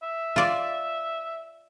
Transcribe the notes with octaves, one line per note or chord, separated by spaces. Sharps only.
E5
F4 D5